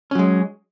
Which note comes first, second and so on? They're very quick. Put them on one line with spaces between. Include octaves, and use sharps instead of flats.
C#4 F#3 G#3